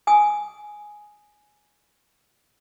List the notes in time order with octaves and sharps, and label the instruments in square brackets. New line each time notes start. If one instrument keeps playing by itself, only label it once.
[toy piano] G#5 D#6